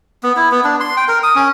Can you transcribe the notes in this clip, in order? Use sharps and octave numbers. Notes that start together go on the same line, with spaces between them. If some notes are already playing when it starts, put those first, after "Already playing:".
B3
E4
B3
D4
C6
G5
A#4
D#6
C#4